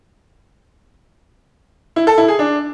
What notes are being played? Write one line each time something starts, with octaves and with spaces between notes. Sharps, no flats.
E4
A4
E4
G#4
D4